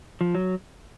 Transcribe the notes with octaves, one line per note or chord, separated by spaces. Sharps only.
F3
F#3